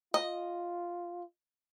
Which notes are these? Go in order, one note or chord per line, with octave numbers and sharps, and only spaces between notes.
F4 D#5